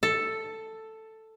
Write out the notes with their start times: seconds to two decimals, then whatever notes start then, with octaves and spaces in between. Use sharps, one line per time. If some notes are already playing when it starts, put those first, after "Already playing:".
0.03 A4